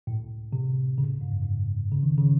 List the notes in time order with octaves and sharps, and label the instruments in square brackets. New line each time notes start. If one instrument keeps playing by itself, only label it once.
[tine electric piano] A2
C3
C#3
G#2
F#2
G#2
C#3
D#3
C#3